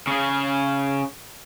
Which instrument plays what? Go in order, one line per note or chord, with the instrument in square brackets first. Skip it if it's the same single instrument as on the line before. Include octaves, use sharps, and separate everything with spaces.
[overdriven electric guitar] C#3 G#4